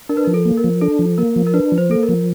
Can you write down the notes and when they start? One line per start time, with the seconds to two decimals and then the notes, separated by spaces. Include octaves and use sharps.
0.09 D4 A#4
0.17 B4
0.25 A#4
0.27 F3
0.34 A4
0.45 A#3
0.58 A#4
0.64 F3
0.81 D4 A4
0.99 F3
1.18 A#3 A#4
1.36 F3
1.46 A#4
1.54 D4 B4
1.72 F3
1.78 C5
1.90 A#3 A4
2.03 A#4
2.09 F3